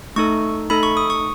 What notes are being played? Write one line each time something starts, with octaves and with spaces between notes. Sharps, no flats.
A3 D#4 A4 C#6
A3 D#4 A4 B5
C#6
D#6
C#6